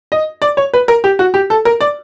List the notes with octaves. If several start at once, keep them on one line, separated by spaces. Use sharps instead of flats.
D#5
D5
C#5
B4
A#4
G4
F#4
G4
A4
A#4
D5